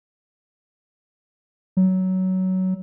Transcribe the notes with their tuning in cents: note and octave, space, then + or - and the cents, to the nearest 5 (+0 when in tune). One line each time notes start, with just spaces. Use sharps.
F#3 +15